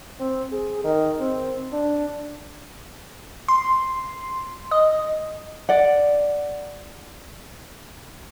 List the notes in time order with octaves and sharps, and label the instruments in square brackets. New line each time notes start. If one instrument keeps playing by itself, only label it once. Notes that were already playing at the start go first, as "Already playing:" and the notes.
[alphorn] C4
G#4
D#3
C4
D4
[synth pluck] C6
D#5
[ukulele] D5 F#5